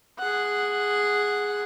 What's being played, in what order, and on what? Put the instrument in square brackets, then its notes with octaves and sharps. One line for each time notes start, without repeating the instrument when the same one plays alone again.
[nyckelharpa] G#4 F#5